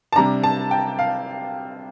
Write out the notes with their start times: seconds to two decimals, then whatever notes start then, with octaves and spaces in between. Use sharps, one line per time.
0.12 A5
0.16 C3 G3 D4 A#5
0.44 A5
0.71 G5
0.99 F5